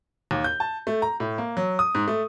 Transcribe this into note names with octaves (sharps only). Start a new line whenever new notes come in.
D#2
G6
A5
A3
A#5
A2
A#3
F#3
D#6
G#2
A3